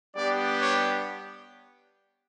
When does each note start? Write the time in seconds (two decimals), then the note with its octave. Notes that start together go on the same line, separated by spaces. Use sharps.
0.15 G3 B3 D4 G4 D5
0.62 C#5